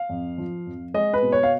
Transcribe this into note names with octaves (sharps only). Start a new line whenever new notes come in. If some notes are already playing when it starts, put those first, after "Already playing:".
Already playing: F5
F2
F3
F2
G#3 D#5
B4
B2
C#5
F5